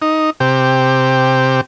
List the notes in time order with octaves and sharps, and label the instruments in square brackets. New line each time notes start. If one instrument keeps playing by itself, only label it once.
[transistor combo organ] D#4
C3 G4